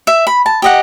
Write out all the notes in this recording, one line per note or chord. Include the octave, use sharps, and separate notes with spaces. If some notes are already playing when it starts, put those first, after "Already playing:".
E5
B5
A5
G4 D#5 F#5